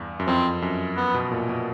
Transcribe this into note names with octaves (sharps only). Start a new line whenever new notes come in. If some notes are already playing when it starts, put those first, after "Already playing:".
Already playing: E2 G2
F#2
F2 C4
F#2
B3
B2
A#2
B2